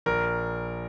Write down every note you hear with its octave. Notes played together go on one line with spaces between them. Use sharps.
A#1 A#4